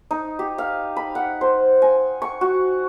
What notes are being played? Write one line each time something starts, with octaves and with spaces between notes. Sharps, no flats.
D#4
G4
F5
B5
F#5
C5
G#5
C#6
F#4